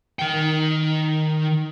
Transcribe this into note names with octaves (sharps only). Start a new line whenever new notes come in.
D#3 G5